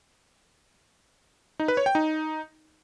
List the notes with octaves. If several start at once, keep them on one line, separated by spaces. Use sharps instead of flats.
D#4
B4
C#5
G5
D#4